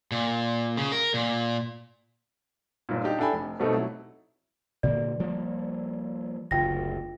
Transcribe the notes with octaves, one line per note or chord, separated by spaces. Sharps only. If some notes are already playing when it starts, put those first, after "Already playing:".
A#2
C#3
A#4
A#2
G1 A#2
D4 D#4 G4
D4 E4 A4 G5 G#5 B5
F1
B2 G3 A3 C4 D#4 A4
F#3 E4
A#2 D3 A#3 D5
F3 G3 A#3
F#1 D2 F4 G5 A#6